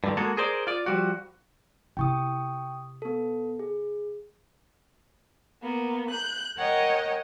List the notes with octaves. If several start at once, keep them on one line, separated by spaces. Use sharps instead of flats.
G2 D3 D#3
G#3 A#3 F#4 G#4 A4
G#4 A#4 C5 D5
F4 D5
F3 G3 F#4
C3 E4 G5 C#6 D#6
B3 A4
G#4
A#3 B3
F#6 G6
A#4 C#5 D#5 F#5 G5